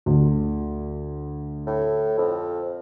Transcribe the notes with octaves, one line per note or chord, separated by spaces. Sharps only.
D2
A2
F2